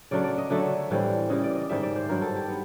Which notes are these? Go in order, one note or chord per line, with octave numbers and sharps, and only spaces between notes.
C#3 F#3 A3 D4 D5
D5
D#5
D3 F#3 A3 E5
A2 E3 G3 C4
C#3 E3 G3 D#5
D5
D#5
G#2 D#3 G3 E5
D5
C5
G2 D#3 F#3 A#4
A4
G4
B3